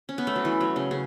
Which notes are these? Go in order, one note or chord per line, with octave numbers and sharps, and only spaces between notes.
C#4
B3
A3
F#3
E3
F#3
C#3
C#3